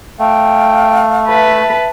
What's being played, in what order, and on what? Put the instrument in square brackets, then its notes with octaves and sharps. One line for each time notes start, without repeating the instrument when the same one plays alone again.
[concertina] A3 [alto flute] F5 [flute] G5
[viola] B4 A5 [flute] E5